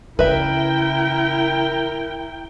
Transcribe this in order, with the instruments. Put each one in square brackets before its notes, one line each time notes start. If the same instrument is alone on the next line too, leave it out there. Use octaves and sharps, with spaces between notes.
[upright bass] C#3 [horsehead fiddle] E4 G5 [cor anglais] A#4 [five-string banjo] B4 E5